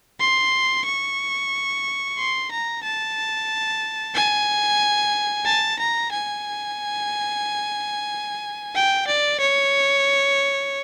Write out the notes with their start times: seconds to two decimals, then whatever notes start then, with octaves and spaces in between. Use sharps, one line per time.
0.20 C6
0.86 C#6
2.18 C6
2.51 A#5
2.84 A5
4.15 G#5
5.46 A5
5.79 A#5
6.12 G#5
8.75 G5
9.07 D5
9.40 C#5